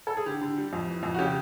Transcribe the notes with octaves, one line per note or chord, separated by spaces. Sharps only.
A4
G#4
D3 G4
D3
G3
F2
E3
F2
F#4
C#3 G4